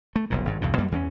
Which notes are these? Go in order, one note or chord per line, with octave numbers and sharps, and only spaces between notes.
A3
F1 B1 A#2
G#1 G2
B1 E2 G2 B2
F#2 B2 G3 A#3
E2 E3 A#3 C#4